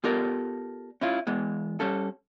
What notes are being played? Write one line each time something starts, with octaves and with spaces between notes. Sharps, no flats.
B3 F4 G4 A4 A#4 D5
C#4 E4 F4
E2 E3 G#3 B3
G3 C#4 A4